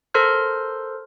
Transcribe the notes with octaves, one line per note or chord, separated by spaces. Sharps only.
A4 A#4 C5 C6 F6 G6